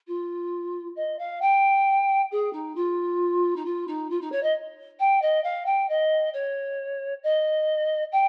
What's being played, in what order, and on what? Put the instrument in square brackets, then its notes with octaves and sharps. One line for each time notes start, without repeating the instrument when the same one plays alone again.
[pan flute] F4
D#5
F5
G5
G#4
D#4
F4
D#4
F4
D#4
F4
D#4
C#5
D#5
G5
D#5
F5
G5
D#5
C#5
D#5
G5